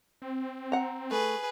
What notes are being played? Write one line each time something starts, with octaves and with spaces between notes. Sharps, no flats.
C4
F#5 A#5
A3 G#4 B4